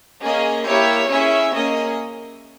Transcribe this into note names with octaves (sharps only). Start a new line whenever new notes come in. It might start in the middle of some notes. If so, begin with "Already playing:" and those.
A#3 C#4 G#4 D#5
A#3 E4 G4 C#5 E5
C#4 E4 G#4 C#5 E5
A#3 C#4 G#4 D#5